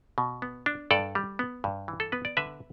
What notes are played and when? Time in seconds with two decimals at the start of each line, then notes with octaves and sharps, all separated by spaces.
0.18 B2
0.42 B3
0.66 D4
0.91 G2 A4 D5
1.15 G3
1.39 B3
1.64 G2
1.88 E3
2.00 A4
2.12 B3 B4
2.25 D5
2.37 D3 B4 E5